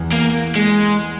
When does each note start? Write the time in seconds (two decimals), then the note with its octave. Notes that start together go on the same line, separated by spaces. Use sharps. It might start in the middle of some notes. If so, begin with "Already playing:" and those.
Already playing: E2
0.12 A#3
0.56 G#3